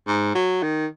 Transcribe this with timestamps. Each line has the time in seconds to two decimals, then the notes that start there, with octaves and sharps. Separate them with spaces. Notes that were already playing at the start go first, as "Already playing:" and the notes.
0.07 G#2
0.35 F#3
0.63 D#3